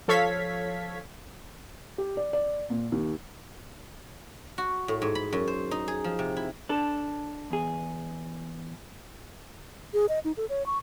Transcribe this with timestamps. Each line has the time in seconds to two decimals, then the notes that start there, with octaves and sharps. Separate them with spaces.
0.08 F3 A4 C#5 F5 G#6 B6
1.98 G4
2.17 D5
2.33 D5
2.70 A#2
2.92 D#2
4.58 F#4
4.88 A2
5.02 G#2
5.15 B5
5.33 F#2
5.48 C5
5.71 D#4
5.88 G#4
6.04 F3
6.19 C3
6.37 E4
6.69 D4 A4
7.51 E2 G#4
9.93 G#4
10.09 D#5
10.25 D#4
10.37 A4
10.49 C#5
10.66 C#6